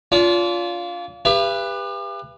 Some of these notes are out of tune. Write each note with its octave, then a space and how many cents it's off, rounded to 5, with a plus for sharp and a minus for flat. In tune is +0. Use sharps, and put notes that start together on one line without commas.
D4 -40 F4 +0
G4 +35 B4 +0 F5 -45